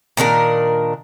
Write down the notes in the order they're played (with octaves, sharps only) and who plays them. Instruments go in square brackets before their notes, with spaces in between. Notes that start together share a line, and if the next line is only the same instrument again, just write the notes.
[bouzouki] A#2 D#3 D4 A#4